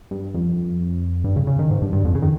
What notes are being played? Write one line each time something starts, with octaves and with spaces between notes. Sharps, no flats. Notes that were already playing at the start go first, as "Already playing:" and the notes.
G2
F2
G2
C#3
C#3
D#3
G#2
G2
G2
F2
C#3
D#3